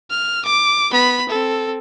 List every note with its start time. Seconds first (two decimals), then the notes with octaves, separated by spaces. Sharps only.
0.10 F6
0.45 D6
0.91 B3 B5
1.29 C4 A4